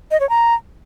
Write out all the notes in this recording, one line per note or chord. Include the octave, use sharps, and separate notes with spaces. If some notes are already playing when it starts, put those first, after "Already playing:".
D#5
C#5
A#5